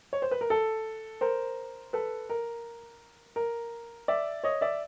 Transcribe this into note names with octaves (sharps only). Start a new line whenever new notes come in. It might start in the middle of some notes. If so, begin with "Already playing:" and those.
C#5
C5
B4
A#4
A4
A#4 C5
A4 B4
A#4
A#4
D5 E5
C#5 D#5
D5 E5